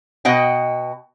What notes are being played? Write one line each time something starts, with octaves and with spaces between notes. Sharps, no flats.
B2 D#5 F#5 G5